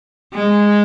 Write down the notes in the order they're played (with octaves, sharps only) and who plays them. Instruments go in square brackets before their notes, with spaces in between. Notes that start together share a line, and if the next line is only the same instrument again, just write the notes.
[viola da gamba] G#3